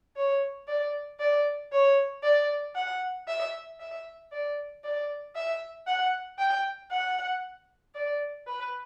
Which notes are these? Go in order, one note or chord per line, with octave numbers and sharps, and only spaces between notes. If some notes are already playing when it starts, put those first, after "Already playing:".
C#5
D5
D5
C#5
D5
F#5
E5
E5
D5
D5
E5
F#5
G5
F#5
D5
B4